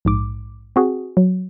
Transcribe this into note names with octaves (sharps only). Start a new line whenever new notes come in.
A#1 G#2 D6
C4 F#4 G#4
F#3